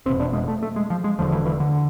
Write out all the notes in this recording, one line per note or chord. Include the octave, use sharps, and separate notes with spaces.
F1 E2 B2 C4
D4
G#3
A3
A3
G#3
F3
G#3
E1 D2 D3 F3
E3
E3
D3